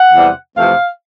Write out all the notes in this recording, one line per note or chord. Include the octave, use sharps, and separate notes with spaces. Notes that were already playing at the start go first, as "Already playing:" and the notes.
Already playing: F#5
E2 C3 E3 G3
F2 C3 E3 A3 C4 F5